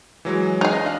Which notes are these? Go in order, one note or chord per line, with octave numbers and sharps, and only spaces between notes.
E3 F#3 G#3
D#4 G#4
D#5
D4 F5